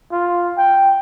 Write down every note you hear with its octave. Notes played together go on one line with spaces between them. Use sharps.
F4
G5